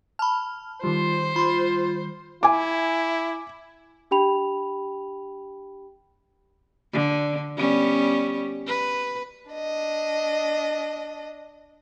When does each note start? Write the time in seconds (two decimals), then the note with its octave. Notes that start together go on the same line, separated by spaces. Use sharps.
0.19 A5 B5 F6
0.84 D#3 G3 F4 C5
1.36 F4 B5 C6
2.43 E4 G#5 D6
4.11 D4 G4 G5 B5 F7
6.93 D3
7.57 G3 B3 C#4
8.67 B4
9.51 D4 D#5